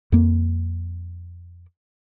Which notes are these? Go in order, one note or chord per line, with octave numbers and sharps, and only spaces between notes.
F2 A#3